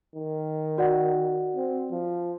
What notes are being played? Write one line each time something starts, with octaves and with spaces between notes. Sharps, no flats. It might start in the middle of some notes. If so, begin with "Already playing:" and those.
D#3
F#4 D5 F#5
C4
F3